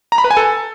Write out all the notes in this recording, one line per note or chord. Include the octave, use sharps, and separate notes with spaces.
A#5
B5
B4
G#5
A4